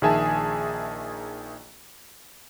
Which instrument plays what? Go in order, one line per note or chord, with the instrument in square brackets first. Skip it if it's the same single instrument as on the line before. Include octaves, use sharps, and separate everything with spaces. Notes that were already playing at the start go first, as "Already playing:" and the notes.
[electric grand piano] A#1 D#3 G#4 E5 G#5 A5